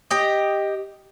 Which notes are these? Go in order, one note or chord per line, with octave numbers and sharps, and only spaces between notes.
G4 D#5